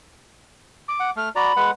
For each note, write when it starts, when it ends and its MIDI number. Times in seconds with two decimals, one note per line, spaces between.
0.88 1.11 86
1.00 1.10 78
1.16 1.29 57
1.16 1.28 89
1.35 1.52 66
1.35 1.52 74
1.35 1.52 82
1.35 1.69 83
1.56 1.71 56
1.56 1.71 71
1.56 1.71 78